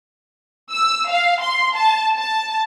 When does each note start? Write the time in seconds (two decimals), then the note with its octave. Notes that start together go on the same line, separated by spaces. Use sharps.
0.71 E6
1.09 F5
1.41 C6
1.75 A5
2.16 A5